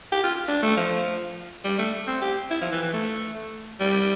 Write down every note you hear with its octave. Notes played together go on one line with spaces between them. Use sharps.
G4
F4
D4
A3
F3
G3
A3
C4
G4
E4
F3
E3
E3
A3
G3